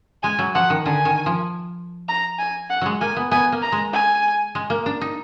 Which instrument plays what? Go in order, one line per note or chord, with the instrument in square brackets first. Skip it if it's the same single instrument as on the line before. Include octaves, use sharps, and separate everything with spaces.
[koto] G#3 [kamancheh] G#5
[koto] F#3
[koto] F3 [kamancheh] F#5
[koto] D#3
[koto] D3 [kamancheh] G#5
[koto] D#3
F3
[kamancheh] A#5
G#5
F#5
[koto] F#3 G#3
[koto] A#3 [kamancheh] G#5
[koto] B3
[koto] B3 [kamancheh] G#5
[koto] A#3
[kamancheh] A#5
[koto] G#3
[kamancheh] G#5
[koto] G#3
A#3
D4
D#4